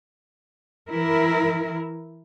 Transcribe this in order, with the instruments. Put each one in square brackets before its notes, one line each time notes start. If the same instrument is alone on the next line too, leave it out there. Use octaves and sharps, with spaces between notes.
[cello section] E3 E4 A#4